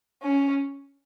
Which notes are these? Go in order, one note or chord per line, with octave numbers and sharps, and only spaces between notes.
C#4